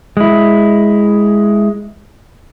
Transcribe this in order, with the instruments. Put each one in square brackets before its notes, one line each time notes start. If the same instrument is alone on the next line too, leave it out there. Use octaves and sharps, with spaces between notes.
[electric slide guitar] G#3 E4